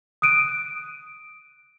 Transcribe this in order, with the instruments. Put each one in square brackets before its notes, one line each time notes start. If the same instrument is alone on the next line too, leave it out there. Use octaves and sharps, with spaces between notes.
[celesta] D#6 F#6 D7 D#7